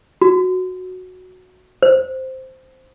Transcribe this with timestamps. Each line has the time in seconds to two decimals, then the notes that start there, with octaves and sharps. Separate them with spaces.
0.22 F#4
1.82 C5